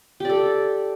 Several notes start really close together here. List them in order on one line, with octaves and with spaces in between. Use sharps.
G4 D5 A4